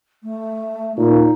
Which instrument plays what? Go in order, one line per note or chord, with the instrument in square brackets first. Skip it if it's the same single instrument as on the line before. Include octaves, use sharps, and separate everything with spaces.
[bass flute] A3
[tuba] A#2 [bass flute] D#4